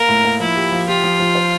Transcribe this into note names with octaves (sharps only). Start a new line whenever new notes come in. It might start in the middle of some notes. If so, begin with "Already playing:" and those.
Already playing: A#3 A#4
A2
A#3
F3 E4
G4
F3
F4 G4
F3
F3
C5